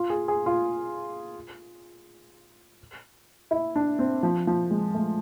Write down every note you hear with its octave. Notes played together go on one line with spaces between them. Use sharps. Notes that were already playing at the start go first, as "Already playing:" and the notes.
Already playing: F4
G#4
G#4
F4
E4
D4
C4
F3
F3
G#3
A3